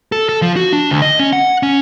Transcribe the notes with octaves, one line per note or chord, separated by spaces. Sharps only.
A4
A4
F3
F#4
D4
D2
D#5
C#4
F#5
C#4